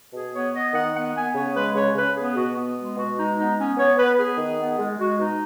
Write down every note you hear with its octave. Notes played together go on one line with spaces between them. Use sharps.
B2 G#4
B3 C#5
B3 D#5
D#3 F#5
B3 F#5
B3 G#5
C#3 C#5
G#3 B4
C#3 C#5
C#3 B4
B3 G#4
B2 F#4
B3
G#3
B2 F#4
G#3 D#4
B3 D#4
B3 C#4
B3 C#5
B3 B4
B3 G#4
D#3
B3
G#3
G#3 F#4
B2 D#4